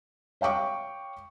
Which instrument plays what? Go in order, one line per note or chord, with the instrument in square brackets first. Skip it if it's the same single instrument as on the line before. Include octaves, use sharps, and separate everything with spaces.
[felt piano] C#5 F5 G5 C#6 D6